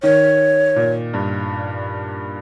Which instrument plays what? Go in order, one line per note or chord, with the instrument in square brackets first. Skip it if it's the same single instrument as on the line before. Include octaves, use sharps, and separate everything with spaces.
[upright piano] D#3 [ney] C#5
[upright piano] A#2
G2